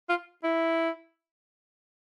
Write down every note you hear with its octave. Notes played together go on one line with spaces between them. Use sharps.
F4
E4